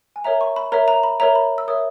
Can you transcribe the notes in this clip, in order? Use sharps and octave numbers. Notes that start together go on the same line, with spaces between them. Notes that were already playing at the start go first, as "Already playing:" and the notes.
G#5
A#4 C#5 E5 A#5
C#6
B5
A#4 C#5 E5 A#5
A#5
B5
A#4 C#5 E5 A#5
B5
E6
A#4 C#5 E5 D#6